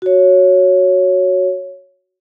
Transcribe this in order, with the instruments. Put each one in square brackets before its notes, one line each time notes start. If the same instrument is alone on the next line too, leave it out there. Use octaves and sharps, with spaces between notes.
[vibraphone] F#4 C#5